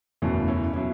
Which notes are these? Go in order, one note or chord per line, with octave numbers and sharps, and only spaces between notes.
F#1 E2 B2 F#3 A3 C#4
C#4 E4
B2 F#3 C#4 E4